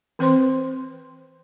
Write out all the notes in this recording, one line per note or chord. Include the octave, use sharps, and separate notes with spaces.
E3 C4 B4 C5 C6